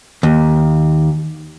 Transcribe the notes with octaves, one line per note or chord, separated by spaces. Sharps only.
D#2